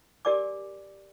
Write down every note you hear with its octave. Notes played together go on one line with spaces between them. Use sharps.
G4 A#4 D5 G#5 D6